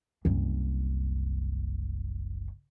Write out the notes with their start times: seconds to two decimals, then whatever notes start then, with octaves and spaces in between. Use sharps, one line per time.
0.25 F#1 C2